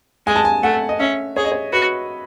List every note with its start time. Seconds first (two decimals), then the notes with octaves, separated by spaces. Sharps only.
0.27 G#3 G#5
0.36 A5
0.45 G#5
0.63 A3 F#5
0.89 D#5
0.99 C#4 E5
1.36 G#4 C#5
1.44 D#5
1.52 C#5
1.73 F#4 B4